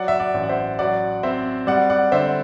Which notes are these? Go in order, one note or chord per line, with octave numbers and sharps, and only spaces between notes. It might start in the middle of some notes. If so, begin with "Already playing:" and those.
Already playing: F#3 D5 F#5
E5
D5 F#5
A1
F#5
C5 E5
F#3 D5 F#5
C4 C5 E5
G3 D5 F#5
D5 F#5
D3 C5 E5